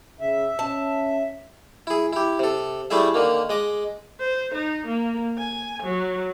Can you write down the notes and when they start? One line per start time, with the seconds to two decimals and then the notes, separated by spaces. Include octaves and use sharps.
0.21 C#3 E5
0.59 C#4 A5
1.87 E4 G#4
2.13 E4 G4
2.39 C3 A4
2.90 G3 A3 E4 G#4 E5
3.14 D3 D#3 A#3
3.49 G#3 D#5 D6
4.20 C5
4.55 D#4
4.87 A#3
5.38 G#5
5.83 F#3